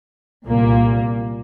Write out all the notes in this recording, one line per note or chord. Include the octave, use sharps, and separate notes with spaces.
C2 A#2 A#3